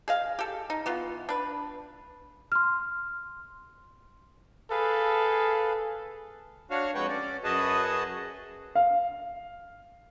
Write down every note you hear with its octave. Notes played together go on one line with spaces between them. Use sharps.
G#4 D#5 F5
G4 A4
D#4
E3 B3 F4
D4 B4
C6 F6
G#4 A4 B4 F5
D4 F#4 C#5 F5
F2 G#3 F#4 B4 C#5 G5
C#4 D5
F#2 F#4 G#4 B4 D#5 A5
F5